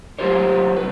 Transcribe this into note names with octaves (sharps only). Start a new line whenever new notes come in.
F#3 G#3 F4 G4 C5 C#5
C2 B4